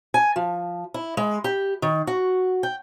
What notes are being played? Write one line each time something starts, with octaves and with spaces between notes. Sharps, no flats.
G#5
F3
E4
G#3
G4
D#3
F#4
G5